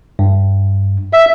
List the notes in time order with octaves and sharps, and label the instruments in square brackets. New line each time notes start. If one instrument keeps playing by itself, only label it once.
[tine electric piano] G2
[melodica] E5